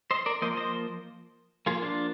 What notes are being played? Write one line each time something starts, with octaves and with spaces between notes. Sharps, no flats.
C5 D#5
A#4 D5
F3 A#3 C5 D#5
C5 D#5
F3 A#3 F4 G#4
D4 F4